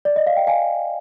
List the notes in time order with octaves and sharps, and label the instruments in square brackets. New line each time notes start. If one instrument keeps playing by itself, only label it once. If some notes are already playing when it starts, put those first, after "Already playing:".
[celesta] D5
D#5
F5
G5
F5 G#5